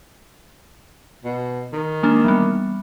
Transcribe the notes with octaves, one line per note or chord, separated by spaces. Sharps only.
B2
D#3
G#3 A#3 D4
E3 G3 B3